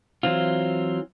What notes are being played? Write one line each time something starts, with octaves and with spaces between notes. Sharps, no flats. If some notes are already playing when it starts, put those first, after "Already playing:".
E3 F#3 C4 F4